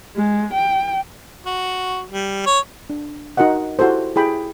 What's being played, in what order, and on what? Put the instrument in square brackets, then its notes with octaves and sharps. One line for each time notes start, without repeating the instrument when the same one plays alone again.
[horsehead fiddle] G#3
G5
[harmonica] F#4
G3
C#5
[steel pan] D4
D#4 F#4 A#4 D#5 F#5
E4 F#4 G4 A4 C5
E4 G4 G#4 G5 B5